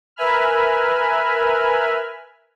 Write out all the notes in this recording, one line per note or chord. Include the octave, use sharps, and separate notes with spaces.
A#4 B4 E5 G#5 B5 F6